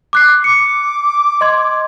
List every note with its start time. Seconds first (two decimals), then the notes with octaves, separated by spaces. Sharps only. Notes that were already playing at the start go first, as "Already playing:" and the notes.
0.13 D6 F#6 C7
0.44 D6 C#7
1.41 D#5 C6 G#6